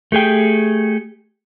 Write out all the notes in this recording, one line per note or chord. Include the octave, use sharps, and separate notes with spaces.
A3 G4 G#4 G5